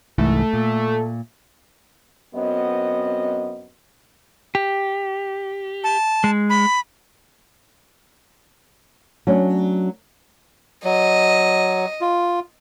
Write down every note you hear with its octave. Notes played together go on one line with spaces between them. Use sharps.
C2 G#2 E3 A3
A#2
F#2 B3 C4 D#5
G4
A5
G#3
B5
F#3 A3 C#4 D4
F#3 D#5
F4